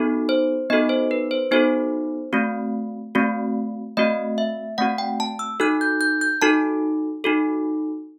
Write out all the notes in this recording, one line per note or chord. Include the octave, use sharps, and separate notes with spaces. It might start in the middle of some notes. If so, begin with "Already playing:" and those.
Already playing: B3 D#4 F#4 A4
C5
B3 D#4 F#4 A4 D#5
C5
B4
C5
B3 D#4 F#4 A4 C5
A3 C4 F#4
A3 C4 F#4
A3 C4 F#4 D#5
E5
A3 C4 F#4 F#5
G5
A5
E6
D#4 F#4 A4 F#6
G6
G6
G6
D#4 F#4 A4 A5
D#4 F#4 A4